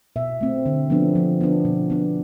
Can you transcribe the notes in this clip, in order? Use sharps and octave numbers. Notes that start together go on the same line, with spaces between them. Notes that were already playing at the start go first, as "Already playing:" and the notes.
B2 E5
A3 C4
D3
F3 B3 D4
F3
B3 D4
B2
B3 D4